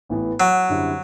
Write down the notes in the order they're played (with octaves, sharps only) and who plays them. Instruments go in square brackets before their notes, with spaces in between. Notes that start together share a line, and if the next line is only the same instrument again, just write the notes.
[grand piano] A1 A2 E3 B3
[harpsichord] F#3
[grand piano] F#2 D3 G3 C4 E4